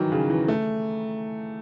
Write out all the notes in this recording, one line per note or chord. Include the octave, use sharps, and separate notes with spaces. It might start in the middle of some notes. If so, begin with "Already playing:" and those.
Already playing: D#3 E3 F#3
C#3
E3
A3